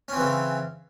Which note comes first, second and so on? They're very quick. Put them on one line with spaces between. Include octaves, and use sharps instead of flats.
C#4 C4 E3 C#3